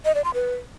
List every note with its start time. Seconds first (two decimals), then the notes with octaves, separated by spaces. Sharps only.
0.05 D#5
0.15 D5
0.24 C6
0.34 B4